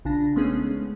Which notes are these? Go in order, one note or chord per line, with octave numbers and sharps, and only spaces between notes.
A#1 C#3 D4 A5 A#6
G#3 A3 B3 C#4 D#4 G#4